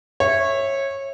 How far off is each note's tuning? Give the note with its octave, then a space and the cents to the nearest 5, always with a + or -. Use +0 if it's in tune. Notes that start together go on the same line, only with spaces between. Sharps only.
C#5 -20 E5 +0